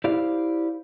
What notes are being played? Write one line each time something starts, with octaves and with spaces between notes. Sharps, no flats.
E4 G4 C5 D5 F5